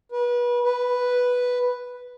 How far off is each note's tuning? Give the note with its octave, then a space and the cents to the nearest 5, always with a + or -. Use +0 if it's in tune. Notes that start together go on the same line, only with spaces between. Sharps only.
B4 -30
B4 +0